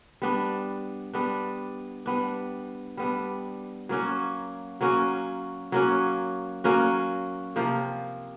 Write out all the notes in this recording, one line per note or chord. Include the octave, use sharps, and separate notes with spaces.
G3 B3 D4
G3 B3 D4
G3 B3 D4
G3 B3 D4
F#3 A#3 C#4 F#4
F#3 A#3 C#4 F#4
F#3 A#3 C#4 F#4
F#3 A#3 C#4 F#4
C3 F3 A#3